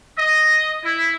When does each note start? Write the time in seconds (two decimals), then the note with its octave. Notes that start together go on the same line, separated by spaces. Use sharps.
0.18 D#5
0.83 E4